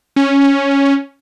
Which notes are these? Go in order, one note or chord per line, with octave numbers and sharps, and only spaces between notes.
C#4